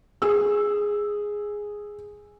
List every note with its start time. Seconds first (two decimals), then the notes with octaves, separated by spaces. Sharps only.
0.22 G#4 E6